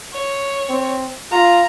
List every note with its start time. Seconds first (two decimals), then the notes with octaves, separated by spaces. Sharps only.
0.13 C#5
0.69 C4
1.31 F4 A#5